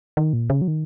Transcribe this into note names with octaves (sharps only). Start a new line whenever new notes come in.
D#3
A#2
C#3
F#3
D#3